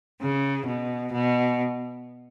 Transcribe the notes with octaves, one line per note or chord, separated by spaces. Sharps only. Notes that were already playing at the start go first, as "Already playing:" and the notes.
C#3
B2
B2